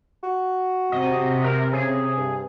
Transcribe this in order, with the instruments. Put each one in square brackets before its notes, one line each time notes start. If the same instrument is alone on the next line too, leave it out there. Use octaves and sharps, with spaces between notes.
[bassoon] F#4
[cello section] C3 [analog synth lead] D#5
[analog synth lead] A#4
[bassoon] C#3 [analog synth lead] G#4
[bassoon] G2